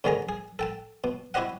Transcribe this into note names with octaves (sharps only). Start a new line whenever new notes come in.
G#2 D3 D#3 G#3 G#4 A#5
G#4
A4 G5 A5
B2
E4 F#4 G4 C5 D#5 F#5